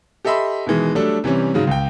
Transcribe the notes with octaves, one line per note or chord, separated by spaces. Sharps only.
G4 A4 D#5 E5 B5 C6
B2 D#3 E3 G#3
F#3 G3 A3 D4 A4
C3 E3 G3 C#4
G#2 C#3 F#3
C#2 G5